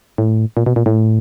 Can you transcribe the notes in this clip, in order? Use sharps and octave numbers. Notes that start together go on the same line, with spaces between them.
A2
A#2
B2
A#2
A2